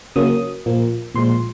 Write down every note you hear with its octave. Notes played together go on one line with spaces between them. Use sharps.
C#3 F#3 A#3 D#6
A#2 F3 A#3
A#2 F3 G#3 C6